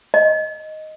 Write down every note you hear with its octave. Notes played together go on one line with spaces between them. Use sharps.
D#5